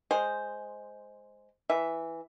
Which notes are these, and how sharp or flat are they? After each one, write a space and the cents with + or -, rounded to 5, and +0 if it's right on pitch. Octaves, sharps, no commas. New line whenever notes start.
G#3 +0 C5 +0
E3 +0 E5 +0